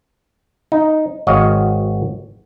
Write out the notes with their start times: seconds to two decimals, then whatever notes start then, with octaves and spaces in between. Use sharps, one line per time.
0.72 D#4
1.27 G#1 F#4 C#5 D#5 F5